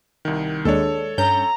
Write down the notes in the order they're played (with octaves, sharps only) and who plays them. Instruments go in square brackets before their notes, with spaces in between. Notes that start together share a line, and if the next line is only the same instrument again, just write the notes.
[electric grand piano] C2 D#3
[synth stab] D#2 G#3 D4 [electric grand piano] A4 C#5
[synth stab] G2 C#4 G6 [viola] A#5